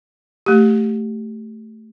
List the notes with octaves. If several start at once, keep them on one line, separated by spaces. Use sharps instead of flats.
A3 G4